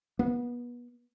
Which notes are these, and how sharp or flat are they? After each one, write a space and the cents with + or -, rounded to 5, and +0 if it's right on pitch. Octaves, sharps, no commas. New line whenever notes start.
B3 -30